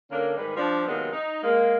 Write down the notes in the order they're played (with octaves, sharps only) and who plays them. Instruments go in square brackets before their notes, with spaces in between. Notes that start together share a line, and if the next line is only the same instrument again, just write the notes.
[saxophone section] D3 A#3 C#4 D4 A#4 C#5
G#2 D#3 G3 B4
F3 G3 D4
C3 D#3 F#3 G#3 A#3 B3
D#4
G#3 A#3